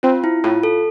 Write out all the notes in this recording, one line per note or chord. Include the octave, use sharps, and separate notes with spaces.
C4 F4
E4
A2 F4
A4